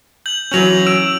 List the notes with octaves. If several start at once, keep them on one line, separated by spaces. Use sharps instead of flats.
G6 F#7
E3 F#3 C#4 G6 F7
E6 D7